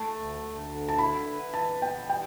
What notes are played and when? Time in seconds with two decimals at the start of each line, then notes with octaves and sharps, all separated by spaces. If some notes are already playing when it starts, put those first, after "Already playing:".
Already playing: A3 A5
0.16 D2
0.43 D2
0.70 D3
0.88 A5
0.98 E4 B5
1.26 B4
1.54 E3 A5
1.81 B3 G5
2.09 G3 G5